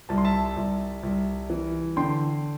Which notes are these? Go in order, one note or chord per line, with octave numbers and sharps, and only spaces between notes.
C2 A5
C6
E5 A5
C2
C2
E3
D3 G5 C6